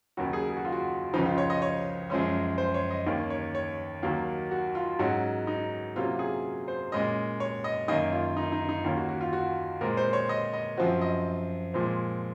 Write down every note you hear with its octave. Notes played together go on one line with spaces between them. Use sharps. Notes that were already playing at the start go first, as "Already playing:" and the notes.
D#2 C#3 F#3 F#4
G#4
G#4
F#4
F4
F#4
C#2 C#3 F3 D#4
F4
C#5
D#5
C#5
F#2 F3 G#3 C#4
C5
C#5
D#5
D#2 D#3 A#3 C#4
C#5
C#5
D#2 D#3 F#3 A#3
F#4
F4
G#2 F#3 C#4 F#4
D#4
C3 F#3 A#3 C#4 F4
G#4
C5
A#2 G#3 C#4 D#5
C#5
D#5
F#2 D#3 A#3 C#4 D#5
F4
D#4
D#4
D#4
D#2 D#3 A#3 C#4 F4
F#4
F#4
F4
F#4
A#2 G#3 C4 A#4
C5
C#5
D#5
D#5
F#2 F3 C4 F#4
D#5
A#2 F3 G#3 C4